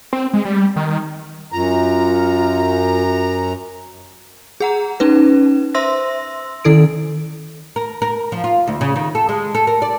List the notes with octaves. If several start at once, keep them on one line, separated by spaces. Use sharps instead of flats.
C4
G#3
G3
D#3
F#2 F4 A#5
G#4 F#5 A#5
C#4 D#4 B4
C5 E5 C6 E6 A#6
D#3 E4 A4 D7
A#4
A#4
F3
F4
D2
C#3
D#3
A4
G#3
A4
A#4
D5